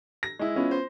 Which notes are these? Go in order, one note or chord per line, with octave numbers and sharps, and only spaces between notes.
A#6
G#3 E4
B3 C#4 F4
C5